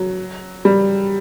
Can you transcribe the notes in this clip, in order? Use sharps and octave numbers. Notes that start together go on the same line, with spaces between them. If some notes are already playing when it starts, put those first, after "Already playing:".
Already playing: F#3
G3